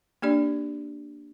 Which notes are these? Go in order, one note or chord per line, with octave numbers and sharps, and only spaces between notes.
A#3 D4 G4 D5